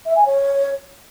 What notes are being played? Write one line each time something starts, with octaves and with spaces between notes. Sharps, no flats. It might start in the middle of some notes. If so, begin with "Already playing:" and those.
E5
G#5
C#5